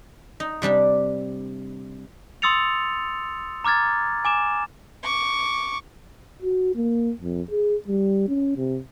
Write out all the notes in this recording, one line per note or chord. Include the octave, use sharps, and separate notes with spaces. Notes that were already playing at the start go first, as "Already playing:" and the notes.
D#4
C3 G3 D4 G4
C6 D#6 E6 A6 C#7 F7
A#5 D6 F6 G#6 A6
G#5 D6 E7
C#6 D6
F#4
A#3
F2
G#4
G3
C#4
C3